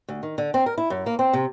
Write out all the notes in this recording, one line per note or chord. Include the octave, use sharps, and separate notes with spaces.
D2
D#3
D3
C4
A#4
E4
F#2
A#3
C4
C3